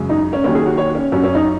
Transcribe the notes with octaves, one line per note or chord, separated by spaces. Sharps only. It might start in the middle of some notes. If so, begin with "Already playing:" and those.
Already playing: F#2 C#3 G#3
D#4
C#4
D#2 D#3 F#3 C#4
G#4
F#4
C#5
C#4
F#2 F#3 C#4
C#4
D#4